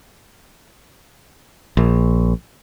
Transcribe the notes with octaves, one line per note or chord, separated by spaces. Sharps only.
A#1